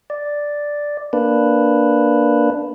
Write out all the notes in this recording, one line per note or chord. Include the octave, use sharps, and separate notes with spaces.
D5
A#3 D4 B4